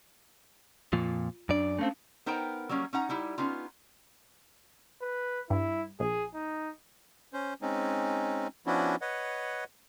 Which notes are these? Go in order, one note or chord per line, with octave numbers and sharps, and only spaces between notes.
F2 A#2 F3 F4
F#2 D4 D5
A3 A#3 C4 C#4 F5
B3 D#4 A#4 C5 G5 A#5
F#3 G3 A#3 C#4
C#4 D#4 F#5 A#5
G3 D#4 E4 G4
B3 C#4 D#4 F4
B4
G2 E4
A#1 G#4
D#4
C#4 C5
G#3 C4 C#4 D#4
F3 B3 C#4 D4 E4 F#4
B4 C#5 D#5 F#5